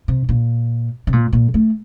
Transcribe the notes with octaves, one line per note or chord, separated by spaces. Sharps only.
C3
A#2
C3
A#2
A#2
A3